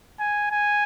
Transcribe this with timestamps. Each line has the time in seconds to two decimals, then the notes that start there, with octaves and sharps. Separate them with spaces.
0.19 G#5
0.51 G#5